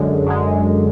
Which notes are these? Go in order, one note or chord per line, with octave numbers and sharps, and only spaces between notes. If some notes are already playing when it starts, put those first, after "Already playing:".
Already playing: F#2 D3 G#3
F#2 D3 G#3